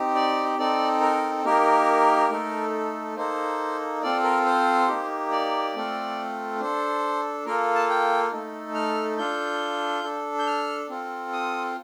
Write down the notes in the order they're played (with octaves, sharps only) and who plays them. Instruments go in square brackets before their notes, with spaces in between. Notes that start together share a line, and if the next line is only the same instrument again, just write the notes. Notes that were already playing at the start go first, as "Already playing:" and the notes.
Already playing: [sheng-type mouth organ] C4 D#4 G4
D5
C4 D#4 A4 D5
A#4
A#3 D#4 G4 A#4
A3 D#4 A4
A#3 D#4 A4 C5
C4 F4 A4 D5
A#4
C5
A#3 D#4 G4
D5
A3 C4 F4 A4
D4 A4 C5
A#3 F4 A4 A#4
A5
G5
A3 D#4 A4
F6
D4 F4 A4 G6
D4 A4
G6
F6
C4 F4 A4
D#6